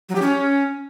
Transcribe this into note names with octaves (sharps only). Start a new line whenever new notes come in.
F#3
G4
C#4